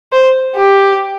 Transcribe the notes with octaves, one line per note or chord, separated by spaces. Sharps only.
C5
G4